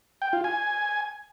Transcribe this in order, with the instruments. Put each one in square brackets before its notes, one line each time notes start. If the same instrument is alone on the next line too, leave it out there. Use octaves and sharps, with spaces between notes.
[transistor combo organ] G5
F4
G#5